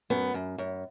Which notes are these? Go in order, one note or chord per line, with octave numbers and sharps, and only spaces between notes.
F#2 B3
F#2
F#2